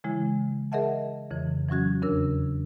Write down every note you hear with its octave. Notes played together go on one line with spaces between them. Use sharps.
C#3 E3 G#3 E4
G#4 A#4 D#5 E5 F#5 A5
F2 C#3 E3
E3 F#3 C#4 F#4 G#6
E2 C#3 D4 A#4 E6